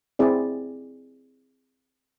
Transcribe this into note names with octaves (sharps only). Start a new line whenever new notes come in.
C4 E4 G#4 D5